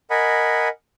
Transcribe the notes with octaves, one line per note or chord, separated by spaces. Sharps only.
A#4 D#5 F#5 G#5 B5